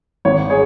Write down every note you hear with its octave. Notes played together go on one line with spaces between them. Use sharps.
G#1 C#5
G#4 C#5